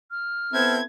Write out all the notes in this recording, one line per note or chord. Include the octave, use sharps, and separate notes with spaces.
F6
B3 C4 E4 A4 G#6